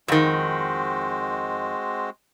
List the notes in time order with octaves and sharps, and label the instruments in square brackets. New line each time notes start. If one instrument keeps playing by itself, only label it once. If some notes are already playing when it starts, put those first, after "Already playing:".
[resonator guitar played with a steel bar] F2 D#3 [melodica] G#3 C4 F#4